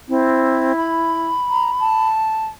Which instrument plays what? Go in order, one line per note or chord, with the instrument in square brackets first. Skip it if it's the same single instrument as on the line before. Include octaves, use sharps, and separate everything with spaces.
[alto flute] C4 [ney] E4
[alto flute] B5
[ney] A#5
A5